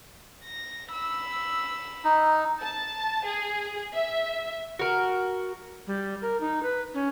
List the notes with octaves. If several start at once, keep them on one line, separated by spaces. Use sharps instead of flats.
A#6
B5 E6
D#4
A5
G#4
E5
F#4 A#4
G3
A#4
D#4
B4
C#4